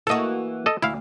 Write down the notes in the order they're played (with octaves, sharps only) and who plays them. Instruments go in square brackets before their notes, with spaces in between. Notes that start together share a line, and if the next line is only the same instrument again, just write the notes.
[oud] E3 A#3 F#4 [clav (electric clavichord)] A4 D#5
[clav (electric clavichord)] A4 D#5
[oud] D2 [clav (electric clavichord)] E4 F5